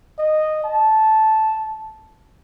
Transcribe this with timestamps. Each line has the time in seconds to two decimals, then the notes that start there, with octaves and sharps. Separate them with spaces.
0.19 D#5
0.64 A5